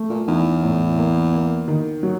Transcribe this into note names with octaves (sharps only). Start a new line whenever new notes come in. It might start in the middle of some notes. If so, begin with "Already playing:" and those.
Already playing: A3
A#2
E2 D#4
A2
A#3
A#3
D#3
F#3